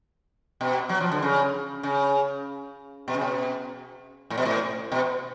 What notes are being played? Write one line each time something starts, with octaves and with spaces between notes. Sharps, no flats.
B2
F#3
F3
D3
C#3
C#3
B2
C#3
B2
A2
B2
A2
B2